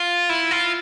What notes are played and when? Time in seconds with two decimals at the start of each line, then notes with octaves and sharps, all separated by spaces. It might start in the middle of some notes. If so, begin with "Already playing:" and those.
Already playing: F4
0.29 E4
0.51 F4